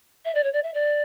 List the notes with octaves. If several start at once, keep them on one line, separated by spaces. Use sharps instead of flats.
E5
D5
C#5
D5
E5
D5